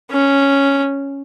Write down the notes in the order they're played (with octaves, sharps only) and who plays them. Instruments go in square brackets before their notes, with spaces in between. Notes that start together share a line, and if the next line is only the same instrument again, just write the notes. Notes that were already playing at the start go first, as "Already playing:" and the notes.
[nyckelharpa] C#4